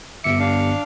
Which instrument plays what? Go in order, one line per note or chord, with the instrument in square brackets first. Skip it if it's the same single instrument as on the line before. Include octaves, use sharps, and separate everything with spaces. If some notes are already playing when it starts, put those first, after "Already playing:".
[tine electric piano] G1 C#7 [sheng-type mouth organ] E5 D6
[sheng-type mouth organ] D4 F5